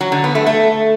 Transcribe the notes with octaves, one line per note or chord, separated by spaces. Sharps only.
F#3
D3
B3
A3
A3